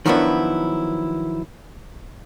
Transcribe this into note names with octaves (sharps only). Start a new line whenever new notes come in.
D#3 F3 F#3 B3 D4 E4